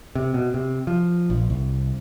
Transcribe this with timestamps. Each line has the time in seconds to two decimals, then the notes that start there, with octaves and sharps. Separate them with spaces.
0.15 C3
0.34 B2
0.54 C3
0.87 F3
1.30 A#1
1.50 C2